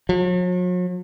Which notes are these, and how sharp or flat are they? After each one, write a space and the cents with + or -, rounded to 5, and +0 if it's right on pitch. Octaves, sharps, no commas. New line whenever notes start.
F#3 -45